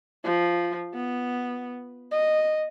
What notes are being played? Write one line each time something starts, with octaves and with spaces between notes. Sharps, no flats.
F3
B3
D#5